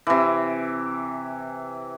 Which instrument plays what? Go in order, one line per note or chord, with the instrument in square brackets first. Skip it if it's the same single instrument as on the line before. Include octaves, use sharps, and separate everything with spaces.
[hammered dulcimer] C3 E3